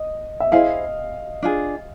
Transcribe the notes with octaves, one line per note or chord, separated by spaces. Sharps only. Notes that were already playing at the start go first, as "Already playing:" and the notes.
Already playing: D#5
E5
E4 G#4 C5 D#5 F5
D4 F4 G#4